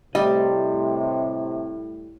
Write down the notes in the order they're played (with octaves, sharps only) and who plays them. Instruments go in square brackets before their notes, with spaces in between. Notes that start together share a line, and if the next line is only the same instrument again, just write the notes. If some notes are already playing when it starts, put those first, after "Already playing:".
[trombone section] A2 [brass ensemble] C3 [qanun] G3 [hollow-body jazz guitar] D#5